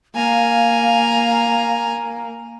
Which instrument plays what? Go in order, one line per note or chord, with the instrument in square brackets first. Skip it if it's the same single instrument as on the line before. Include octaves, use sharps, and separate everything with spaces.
[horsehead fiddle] A#3 [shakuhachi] F5 [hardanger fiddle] G#5 A#5